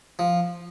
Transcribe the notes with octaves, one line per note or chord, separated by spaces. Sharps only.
F3